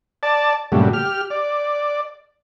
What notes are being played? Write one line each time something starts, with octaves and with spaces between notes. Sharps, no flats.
D5 A5
G2 A#2 C#3 F#3 G3 A3
G4 F6
D5